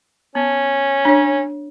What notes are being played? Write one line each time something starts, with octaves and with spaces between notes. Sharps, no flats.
B3 C#4
D4 C#5